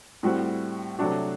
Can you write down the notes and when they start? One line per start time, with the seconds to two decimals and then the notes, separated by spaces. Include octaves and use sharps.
0.23 A2 G3 C4 F#4
0.99 C3 F#3 A3 D4 F#4